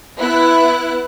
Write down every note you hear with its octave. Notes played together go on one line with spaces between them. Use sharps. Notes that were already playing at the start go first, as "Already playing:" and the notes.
B3 E4 F#6